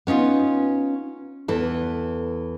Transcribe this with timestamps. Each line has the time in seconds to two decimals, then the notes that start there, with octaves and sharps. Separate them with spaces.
0.07 B3 C#4 D#4 F4
1.48 E2 E3 A4